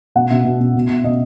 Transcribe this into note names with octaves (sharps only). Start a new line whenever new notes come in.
B2 F#5
B2 E5
B2
B2
B2
B2
B2 D#5